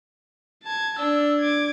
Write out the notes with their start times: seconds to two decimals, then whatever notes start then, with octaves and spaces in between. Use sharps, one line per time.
0.63 A5 G#6
0.98 D4 E6
1.40 D6 G#6